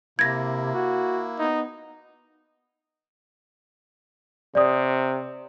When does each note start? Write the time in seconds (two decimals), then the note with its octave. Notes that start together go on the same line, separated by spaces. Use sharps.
0.19 C3 A#3 E4 G#6 A#6
0.74 F#4
1.39 B3 D#4
4.55 C3 D5 D#6